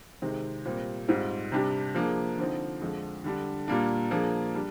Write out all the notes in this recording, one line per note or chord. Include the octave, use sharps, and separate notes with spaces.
C3 D#3 G#3 C4
A#2 G3 C4 G4
G#2 G3 C4 F4
C3 G3 D4 G4
F3 A#3 D4 G#4
D3 F3 C4 D#4
F2 D3 F3 G#3
D3 G3 D4
A#2 G3 A#3 D4
F3 A#3 D4 G#4
G3 D4